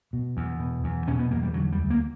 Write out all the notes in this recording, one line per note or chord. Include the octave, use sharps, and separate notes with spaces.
B2
E2
B2
E2
B2 C#4
B3
E2 A#3
G3
D3 F#3
G3
D2
A#3